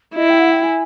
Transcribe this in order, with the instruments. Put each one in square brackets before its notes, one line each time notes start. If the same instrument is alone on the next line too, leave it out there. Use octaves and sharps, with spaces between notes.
[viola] E4 [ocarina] D#5
[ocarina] G5
F#5
G5
G#5